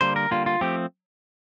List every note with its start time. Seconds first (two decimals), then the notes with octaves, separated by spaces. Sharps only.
0.01 D3 G3 A#3 C5
0.16 A#4
0.31 D3 G3 A#3 F4
0.46 F4
0.61 F3 A3 C4 G4